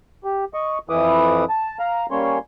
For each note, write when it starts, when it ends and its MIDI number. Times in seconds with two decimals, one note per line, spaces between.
0.24 0.45 67
0.54 0.78 75
0.54 0.78 85
0.89 1.44 41
0.89 1.44 52
0.89 1.44 64
0.89 1.44 71
0.89 1.44 86
0.89 1.44 87
1.49 1.78 81
1.79 2.06 77
1.79 2.06 82
2.11 2.38 55
2.11 2.38 58
2.11 2.38 61
2.11 2.38 73
2.11 2.38 84